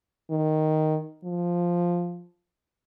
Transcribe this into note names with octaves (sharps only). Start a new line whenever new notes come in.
D#3
F3